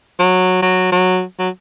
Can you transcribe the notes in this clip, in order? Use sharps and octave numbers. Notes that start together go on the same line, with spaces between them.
F#3
F#3
F#3
F#3